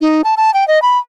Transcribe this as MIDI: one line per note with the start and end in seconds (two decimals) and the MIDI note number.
0.01 0.22 63
0.24 0.34 81
0.37 0.53 81
0.54 0.67 79
0.68 0.81 75
0.82 0.98 83